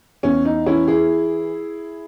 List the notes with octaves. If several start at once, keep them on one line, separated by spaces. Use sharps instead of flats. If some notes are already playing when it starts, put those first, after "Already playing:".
E2 C#4
D#4
E3 C#4 E4
E4 G#4